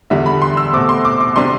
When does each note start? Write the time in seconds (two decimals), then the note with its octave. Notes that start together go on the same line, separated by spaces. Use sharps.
0.10 E2 D3 G3 E5
0.26 B5
0.42 C6
0.57 E6
0.73 B2 A3 C4 D6
0.89 C6
1.05 D6
1.20 D6
1.36 C3 G3 D4 C6